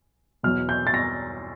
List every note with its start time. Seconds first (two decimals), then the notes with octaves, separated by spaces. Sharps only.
0.43 E2 B2 F#3 F6
0.69 G6
0.87 A6
0.94 A#6